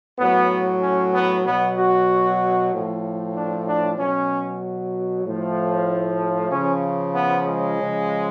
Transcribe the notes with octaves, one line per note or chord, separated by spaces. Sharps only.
A2 F#3 B3
C#4
B3
B2 F#3 B3
F#4
A2 F3
D4
D4
B2 F#3 C#4
A2 F3
C#3 F3 C#4
B3
G#3
C#3 F3